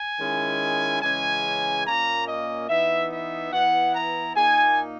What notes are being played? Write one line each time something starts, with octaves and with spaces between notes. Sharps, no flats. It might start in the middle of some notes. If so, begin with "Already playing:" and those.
Already playing: G#5
D#3 G#3 C#4 E4
C#3 E3 G#3 C#4 G#5
A#2 A#3 C#4 A#5
D#5
E3 B3 D#4 E5
E5
E3 B3 E4 F#5
A#5
A#2 A#3 D#4 G#5